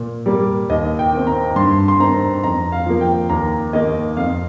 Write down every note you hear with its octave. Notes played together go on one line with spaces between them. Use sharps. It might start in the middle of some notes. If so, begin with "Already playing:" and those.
Already playing: A#2
G3 A#3
D#2 D#5
G5
D#3 C4
A#5
G2 C6
C6
D#3 C4 A#5
F2 A#5
F5
F3 A#3
G5
D#2 A#5
D#3 A#3 D#5
F2 F5